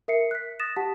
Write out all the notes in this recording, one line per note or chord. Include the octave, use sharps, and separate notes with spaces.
A#4 E5 C7 C#7
F#6 B6
D#6 A6 A#6 E7
G4 F#5 A5 B6